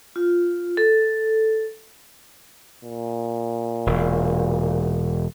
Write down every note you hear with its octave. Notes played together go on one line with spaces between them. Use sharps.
F4
A4
A#2
E1